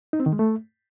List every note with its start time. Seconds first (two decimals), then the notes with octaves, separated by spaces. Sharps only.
0.13 D#4
0.20 C4
0.26 D#3
0.33 G#3
0.39 A3